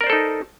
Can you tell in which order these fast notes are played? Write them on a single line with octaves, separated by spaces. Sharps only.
A#4 D5 C5 A4 D#4